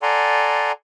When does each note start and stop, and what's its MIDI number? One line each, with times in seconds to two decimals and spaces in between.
0.02 0.72 69
0.02 0.72 74
0.02 0.72 78
0.02 0.72 80
0.02 0.72 82
0.02 0.72 84